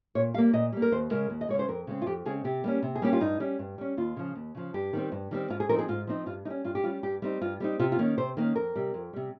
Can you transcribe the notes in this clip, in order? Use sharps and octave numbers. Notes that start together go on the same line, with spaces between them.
A#2 C#5
G3 A#3 F5
A#2 D#5
G3 A#3
A#4
D#2 C5
C#3 G#3 A#4
D#2
D#5
C#3 G#3 C#5
C5
F2 A#4
C#3 G#3 C4
F4
F2 G4
C#3 G#3 C4 G#4
C3 G4
G3 A#3 C#4
C3
G#4
G3 A#3 C#4 G4
F4
G2 D#4
G3 C#4
G2
G3 C#4
D#2 F4
C#3 F3
D#2
C#3 F3
G2 G4
D#3 G3 C4
G2
D#3 G3 C4
G#2 F4
G#4
F3 C4 D#4 A#4
G#4
G#2 F4
F3 C4 D#4
G2 F4
G3 C#4 D#4
G2 F4
G4
G3 C#4 F4
G2 G4
G3 C4 D#4
G2 F4
G3 C4 D#4
C3 F4
F4
D#3 A#3 C#4
C3 C5
D#3 A#3 C#4
F2 A#4
C3 G3
F2
C3 G3